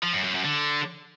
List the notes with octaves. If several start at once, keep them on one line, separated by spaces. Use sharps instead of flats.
F3
F#2
F#2
F#2
D3